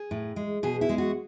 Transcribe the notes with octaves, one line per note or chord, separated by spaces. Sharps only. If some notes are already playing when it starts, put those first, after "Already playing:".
Already playing: G#4
A2
G#3
B2 G#4
E4
G#3
F#4